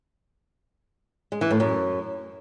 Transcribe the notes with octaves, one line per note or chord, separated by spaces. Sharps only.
G#3
E3
A2
F#2